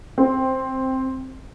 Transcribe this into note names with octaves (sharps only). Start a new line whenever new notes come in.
C4